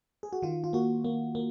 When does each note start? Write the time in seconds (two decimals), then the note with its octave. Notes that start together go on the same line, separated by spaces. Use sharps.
0.23 G#4
0.33 F#4
0.42 D#3 F4
0.64 F4
0.73 A#3 F#4
1.04 A#3
1.35 A#3